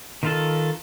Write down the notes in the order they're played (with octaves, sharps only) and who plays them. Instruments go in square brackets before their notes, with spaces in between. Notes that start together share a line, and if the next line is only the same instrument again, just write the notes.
[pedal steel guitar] D#3 F4 A4